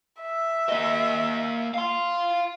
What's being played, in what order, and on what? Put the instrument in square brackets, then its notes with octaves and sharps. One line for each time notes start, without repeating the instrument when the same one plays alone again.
[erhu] E5
[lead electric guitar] A#3 D#5
F5 C6